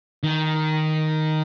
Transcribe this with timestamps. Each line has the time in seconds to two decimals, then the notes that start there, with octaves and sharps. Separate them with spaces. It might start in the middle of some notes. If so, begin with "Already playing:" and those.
0.23 D#3